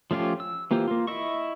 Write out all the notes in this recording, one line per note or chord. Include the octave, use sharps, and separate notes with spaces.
F3 A3 C#4 F4 G4
E6
E3 A#3 F4 G4 C5
A#3 F4
E4 D#5 E5 C#6